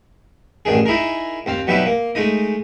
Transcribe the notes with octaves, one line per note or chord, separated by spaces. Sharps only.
A1 D#3 D4 G#4
D#4 E4 G#4 A#4
D#2 C4 F5
B2 F#3 G3 B3 D#4 E4
A#3
G#3 A3 D#4 D#5